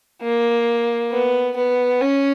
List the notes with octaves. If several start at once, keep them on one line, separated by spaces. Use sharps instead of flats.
A#3
B3
B3
C#4